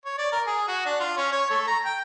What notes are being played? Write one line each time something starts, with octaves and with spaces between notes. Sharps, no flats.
C#5
D5
A#4
G#4
F#4
D4
F4
C#4
C#5
A3
A#5
G5